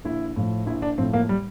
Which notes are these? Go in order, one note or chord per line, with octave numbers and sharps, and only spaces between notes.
A#1 E4
A2 F3
A#1 E4
D4
A2 F3 C4
A#3
G3